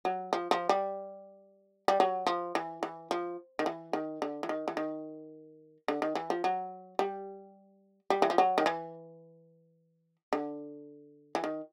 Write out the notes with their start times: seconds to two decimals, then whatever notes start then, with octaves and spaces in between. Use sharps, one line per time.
0.05 F#3
0.33 F3
0.51 F3
0.69 G3
1.88 G3
2.00 F#3
2.27 F3
2.55 E3
2.83 E3
3.11 F3
3.59 D#3
3.66 E3
3.93 D#3
4.22 D3
4.43 E3
4.49 D#3
4.68 E3
4.77 D#3
5.88 D3
6.02 D#3
6.15 E3
6.30 F3
6.44 F#3
6.99 G3
8.10 G3
8.22 E3
8.30 F3
8.38 F#3
8.58 D#3
8.66 E3
10.33 D3
11.35 E3
11.44 D#3